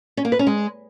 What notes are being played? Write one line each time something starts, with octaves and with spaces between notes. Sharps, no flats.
C#4
A#3
B4
C#4
G#3